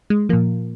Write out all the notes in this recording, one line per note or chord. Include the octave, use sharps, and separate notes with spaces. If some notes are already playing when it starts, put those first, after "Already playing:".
G#3
A#2 F3 A#3